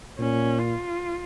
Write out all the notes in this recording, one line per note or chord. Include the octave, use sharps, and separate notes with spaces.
A#2 C#4
F4